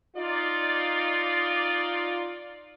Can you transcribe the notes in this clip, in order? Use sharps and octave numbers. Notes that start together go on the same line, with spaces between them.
D#4 F4 D5